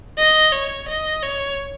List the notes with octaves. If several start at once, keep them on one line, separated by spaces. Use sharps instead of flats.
D#5
C#5
D#5
C#5